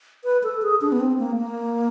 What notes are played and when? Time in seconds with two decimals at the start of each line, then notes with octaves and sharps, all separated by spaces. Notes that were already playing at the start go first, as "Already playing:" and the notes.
0.24 B4
0.43 A4
0.62 G#4
0.81 D4
0.92 B3
1.00 C4
1.19 A#3
1.37 A#3